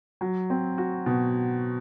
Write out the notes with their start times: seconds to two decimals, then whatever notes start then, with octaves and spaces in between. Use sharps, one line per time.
0.21 F#3
0.50 C4
0.78 F#4
1.06 B2